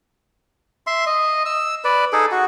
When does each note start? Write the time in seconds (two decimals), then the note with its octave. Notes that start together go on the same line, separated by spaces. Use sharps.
0.87 E5 C6
1.06 D#5
1.46 E6
1.84 B4 D5
2.13 D#4 G#4 A4
2.32 F#4